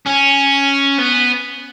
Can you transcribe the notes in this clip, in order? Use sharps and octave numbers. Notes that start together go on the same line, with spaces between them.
C#4
B3